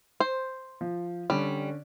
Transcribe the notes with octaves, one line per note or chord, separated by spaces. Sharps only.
C5
F3
D3 G3 C#4